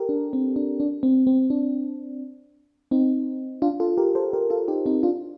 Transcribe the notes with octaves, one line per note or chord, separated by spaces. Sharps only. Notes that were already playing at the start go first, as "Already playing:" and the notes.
Already playing: G4 A4 A#4
D4
C4
D4
D4
C4
C4
D4
C4 D#4
D4 F4
F4 A4
G4 A#4
A4 C5
G4 A#4
F4 A4
D#4 G4
C4 D#4
D4 F4